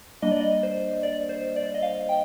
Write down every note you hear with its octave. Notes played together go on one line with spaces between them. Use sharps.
G3 A#3 D4 D#5
D5
D#5
C5
D5
C5
D5
D#5
F5
G5